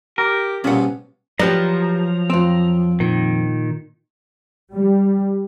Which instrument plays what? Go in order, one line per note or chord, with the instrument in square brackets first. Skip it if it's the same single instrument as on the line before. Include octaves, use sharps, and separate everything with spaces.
[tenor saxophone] G4 [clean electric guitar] A#4
[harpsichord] A#1 G2 B2 [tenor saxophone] F3 [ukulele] C#4 F#5
[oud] F3 [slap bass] F#3 [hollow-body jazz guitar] G4 B4 D5 [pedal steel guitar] A#5
[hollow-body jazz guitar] F2 C4
[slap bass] A#2 [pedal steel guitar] D#3
[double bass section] G3